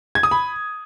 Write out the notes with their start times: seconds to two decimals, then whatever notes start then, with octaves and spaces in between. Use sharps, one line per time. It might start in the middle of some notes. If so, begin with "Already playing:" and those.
0.15 G#6
0.23 D#6
0.31 B5